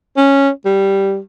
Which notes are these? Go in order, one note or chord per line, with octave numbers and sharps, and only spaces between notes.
C#4
G3